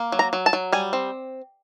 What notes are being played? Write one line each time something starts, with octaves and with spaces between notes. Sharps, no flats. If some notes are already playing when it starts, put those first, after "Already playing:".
Already playing: A#3
F#3
A#5
F#3
A5
F#3
G3 G#5
C4